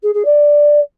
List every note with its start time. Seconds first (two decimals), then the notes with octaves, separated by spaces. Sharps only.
0.02 G#4
0.14 G#4
0.25 D5